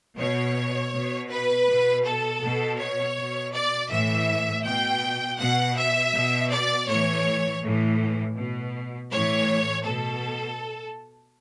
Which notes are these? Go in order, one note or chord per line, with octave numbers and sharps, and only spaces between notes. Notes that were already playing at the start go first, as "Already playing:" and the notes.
B2 C#5
B2
B4
B2
A4
B2
C#5
B2
D5
A2 E3 E5
B2 G5
B2 F#5
E5
B2
D5
A2 E3 C#5
A2 E3
B2
A2 E3 C#5
B2 A4